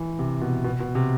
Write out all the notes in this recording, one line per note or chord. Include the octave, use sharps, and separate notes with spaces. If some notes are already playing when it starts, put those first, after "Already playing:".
Already playing: E3
C3
B2
B2
B2
C3